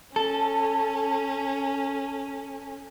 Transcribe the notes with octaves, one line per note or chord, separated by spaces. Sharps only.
C#4 A4